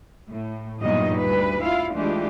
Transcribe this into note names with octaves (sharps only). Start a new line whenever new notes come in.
A2
E2 G2 A#2 D#3 F#3 D#5
D2 G3 B4
E4 F4 F5
E3 G#3 A3 D4 F4 G4